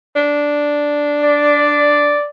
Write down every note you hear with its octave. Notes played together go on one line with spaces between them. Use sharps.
D4
D5